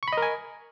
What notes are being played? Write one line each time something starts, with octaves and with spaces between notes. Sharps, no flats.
A#4 D#5 G#5 B5 C#6